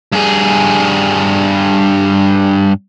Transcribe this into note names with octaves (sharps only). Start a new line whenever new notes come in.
G2 G#4